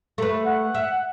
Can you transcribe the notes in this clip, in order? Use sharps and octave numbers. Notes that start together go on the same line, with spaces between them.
A3 B4
F#5
E5